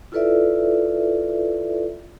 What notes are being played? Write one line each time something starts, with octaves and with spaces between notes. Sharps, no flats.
E4 F4 A4 B4 D5 E5